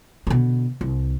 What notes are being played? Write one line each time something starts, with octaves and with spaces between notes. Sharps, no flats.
B2 D3
C2